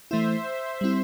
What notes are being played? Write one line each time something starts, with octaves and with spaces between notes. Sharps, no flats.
E3 A3 E4 C5 E5
G3 C4 E4